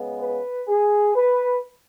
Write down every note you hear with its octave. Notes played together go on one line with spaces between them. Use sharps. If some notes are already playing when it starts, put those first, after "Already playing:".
Already playing: C#3 G#3 B3
B4
G#4
B4